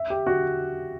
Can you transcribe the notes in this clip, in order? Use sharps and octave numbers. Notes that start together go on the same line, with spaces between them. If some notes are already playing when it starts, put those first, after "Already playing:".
Already playing: E5
G4
F#4